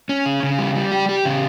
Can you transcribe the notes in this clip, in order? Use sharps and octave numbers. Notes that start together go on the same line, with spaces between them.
C#4
C#3
C#3
G3
G3
G4
G4
C#3